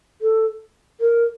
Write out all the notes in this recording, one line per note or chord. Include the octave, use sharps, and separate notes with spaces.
A4
A#4